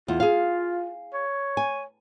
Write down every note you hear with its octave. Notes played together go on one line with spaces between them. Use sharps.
E2 F4
G#4 F5
C#5
G#5